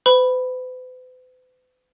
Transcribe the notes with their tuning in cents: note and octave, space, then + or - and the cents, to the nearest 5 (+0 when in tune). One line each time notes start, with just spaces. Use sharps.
B4 +45 B5 +0